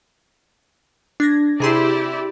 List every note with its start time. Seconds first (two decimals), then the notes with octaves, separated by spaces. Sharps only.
1.20 D4 G#6 A#6
1.60 C3 E4 G4 G#4 D5 C6